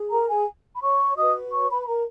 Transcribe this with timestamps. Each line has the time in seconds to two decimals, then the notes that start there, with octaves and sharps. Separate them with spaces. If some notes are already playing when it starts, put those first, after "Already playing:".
Already playing: G#4
0.11 A#4 A#5
0.29 G#4 G#5
0.75 B5
0.82 C#5 C#6
1.16 F#4 B4 D#5 D#6
1.52 C#5 C#6
1.69 B4 B5
1.83 B5
1.87 A#4 A#5